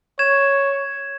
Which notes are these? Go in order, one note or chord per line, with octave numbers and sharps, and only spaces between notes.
C#5 G#6 E7